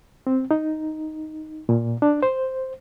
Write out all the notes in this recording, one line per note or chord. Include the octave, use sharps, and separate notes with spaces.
C4
D#4
A#2
D4
C5